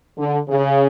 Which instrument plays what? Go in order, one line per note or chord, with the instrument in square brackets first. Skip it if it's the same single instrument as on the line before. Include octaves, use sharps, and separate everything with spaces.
[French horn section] D3
C#3